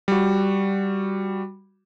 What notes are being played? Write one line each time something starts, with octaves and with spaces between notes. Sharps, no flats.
G3 F#4